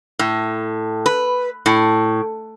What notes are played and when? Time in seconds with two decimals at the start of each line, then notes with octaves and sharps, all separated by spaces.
0.19 A2
1.06 B4
1.66 A2